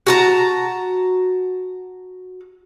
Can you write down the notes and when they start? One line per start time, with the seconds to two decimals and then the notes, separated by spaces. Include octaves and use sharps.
0.07 F#4 A5 A#5